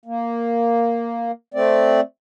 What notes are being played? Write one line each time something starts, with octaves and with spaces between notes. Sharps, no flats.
A#3
A3 C4 D5